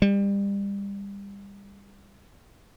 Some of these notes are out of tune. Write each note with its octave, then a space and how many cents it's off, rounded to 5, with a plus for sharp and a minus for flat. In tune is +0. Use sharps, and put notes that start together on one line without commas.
G3 +30